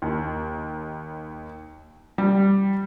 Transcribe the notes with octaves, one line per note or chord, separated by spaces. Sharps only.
D#2
G3